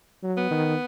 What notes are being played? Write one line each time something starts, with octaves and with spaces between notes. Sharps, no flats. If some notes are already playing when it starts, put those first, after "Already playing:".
F#3
B3
D#3